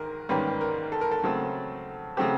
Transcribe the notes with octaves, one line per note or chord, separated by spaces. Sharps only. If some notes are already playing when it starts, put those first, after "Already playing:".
Already playing: G#2 D#3 A#4
G#2 D#3 G3 A#3 C#4 B4
A#4
A4
A#4
A4
C#3 F#3 A3 C4
C#3 F#3 A3 C4 G4